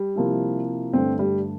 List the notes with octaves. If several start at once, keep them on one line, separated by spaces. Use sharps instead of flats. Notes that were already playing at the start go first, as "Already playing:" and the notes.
Already playing: G3
C3 F3 A#3 E4
G2 D3 A3 C4
G3